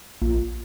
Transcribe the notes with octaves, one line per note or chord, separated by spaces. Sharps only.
A#1